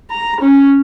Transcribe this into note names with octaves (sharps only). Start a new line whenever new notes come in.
A#5
C#4